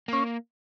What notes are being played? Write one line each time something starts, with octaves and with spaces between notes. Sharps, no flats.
A#3 C#4